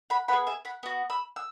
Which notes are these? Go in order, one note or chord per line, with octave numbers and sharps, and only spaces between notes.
F#5 B5
B3 G#4 F#5 B5
E5 G#5
F#5 B5
B3 F#4
B5 E6
E6